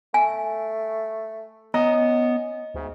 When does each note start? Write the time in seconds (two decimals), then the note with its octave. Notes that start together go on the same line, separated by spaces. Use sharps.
0.14 A3 G#5
1.74 B3 C#4 D#5 A#5
2.75 D2 G#2